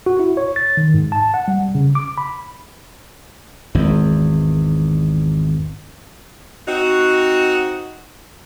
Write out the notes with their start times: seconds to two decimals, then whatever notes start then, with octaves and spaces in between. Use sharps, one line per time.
0.06 F#4
0.19 E4
0.37 C#5
0.56 A6
0.77 D#3
0.94 G#2
1.12 A5
1.34 F#5
1.48 G3
1.75 C#3
1.95 D6
2.18 B5
3.75 G#1 E2
6.68 C4 D#4 F#4